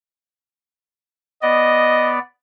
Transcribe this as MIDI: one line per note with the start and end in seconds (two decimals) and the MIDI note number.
1.43 2.19 59
1.43 2.19 74
1.43 2.13 75